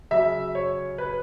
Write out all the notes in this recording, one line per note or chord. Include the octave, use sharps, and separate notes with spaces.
C#3 F#3 E5
C#5
B4